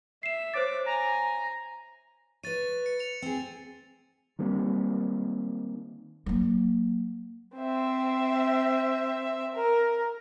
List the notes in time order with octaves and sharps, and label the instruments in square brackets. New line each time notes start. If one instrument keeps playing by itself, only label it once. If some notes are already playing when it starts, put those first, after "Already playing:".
[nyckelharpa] E5 [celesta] C7 E7
[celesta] C5 C#5 A6 [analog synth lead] D6
[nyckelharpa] G#5 [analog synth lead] A#5
[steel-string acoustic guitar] B4 C#5 [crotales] A6 D#7
[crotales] C#7
C#7 F7
[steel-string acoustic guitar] C4 G#4
[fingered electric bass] D#3 G3 A#3 C4
[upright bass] F#3 A#3
[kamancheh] C4 E5
A#4